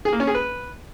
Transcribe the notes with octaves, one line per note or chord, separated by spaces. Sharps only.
G#4
A#3
C#4
G#4
B4